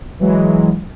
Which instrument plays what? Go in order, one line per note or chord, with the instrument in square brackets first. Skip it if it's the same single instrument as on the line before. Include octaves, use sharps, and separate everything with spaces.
[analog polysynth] E3 F#3 G#3